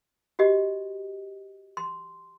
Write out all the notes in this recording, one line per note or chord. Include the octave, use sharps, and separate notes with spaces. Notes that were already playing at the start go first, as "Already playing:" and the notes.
F#4 G4 D#5
C6